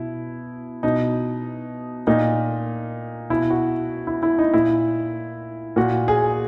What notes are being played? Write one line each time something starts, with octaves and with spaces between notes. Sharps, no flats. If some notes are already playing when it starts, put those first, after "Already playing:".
Already playing: B2 E4
B2 D#4
A#2 D#4
B2 E4
F#4
E4
E4
D#4
A#2 E4
A#2 F#4
G#4